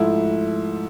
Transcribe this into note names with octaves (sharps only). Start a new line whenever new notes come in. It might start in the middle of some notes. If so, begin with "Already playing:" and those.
Already playing: G#2 F3 A3 E4